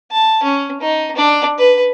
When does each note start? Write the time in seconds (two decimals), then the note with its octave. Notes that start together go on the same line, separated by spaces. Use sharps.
0.12 A5
0.43 C#4
0.81 D#4
1.16 D4
1.58 B4